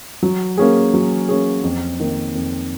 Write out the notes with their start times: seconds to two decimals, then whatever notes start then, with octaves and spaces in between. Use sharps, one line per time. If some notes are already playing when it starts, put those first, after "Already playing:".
0.23 F#3
0.57 A#3 C#4 G#4
0.94 F#3
1.28 A#3 C#4 G#4
1.63 F2
2.00 D#3 A#3 D#4
2.35 F2